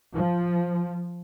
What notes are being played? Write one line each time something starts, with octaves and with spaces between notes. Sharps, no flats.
F3